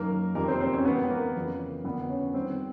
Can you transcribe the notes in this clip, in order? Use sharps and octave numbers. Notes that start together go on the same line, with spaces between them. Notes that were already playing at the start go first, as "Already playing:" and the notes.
Already playing: F#2 D#3 A#3 A#4
F2 C3 D#3 A#3 A#4
C4 C5
C4 C5
C#4 C#5
G#2 E3 B3 B4
A#3 A#4
F2 C#3 E3
F2 D3 B3 B4
C#4 C#5
G2 D#3 C4 C5